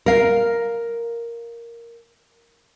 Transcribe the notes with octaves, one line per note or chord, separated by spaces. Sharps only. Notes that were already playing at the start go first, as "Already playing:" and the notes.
A#4 F5